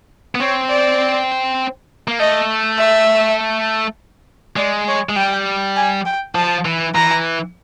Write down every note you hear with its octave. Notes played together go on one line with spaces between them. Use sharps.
B3
C4 C#5
D5
A#3
A3 D#5
E5
G#3 D5
C#5
G#3
G3 G5
G#5
G5
F3 A5
E3
E3 A#5